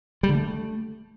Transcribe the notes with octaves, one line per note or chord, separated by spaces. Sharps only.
G3
D3
A3